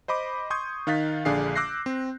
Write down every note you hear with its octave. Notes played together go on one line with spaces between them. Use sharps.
C5 D#5 B5 D6
C6 C#6 D#6 G6 G#6
D#3 D#4 F5 F#6 A6 B6
A#1 D3 D4 G#4 F5 C7
D6 E6 F#6 G6 A#6 C7
C4